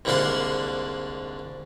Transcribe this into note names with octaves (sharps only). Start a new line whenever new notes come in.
C2 G#2 D3 A#3 F#5 C6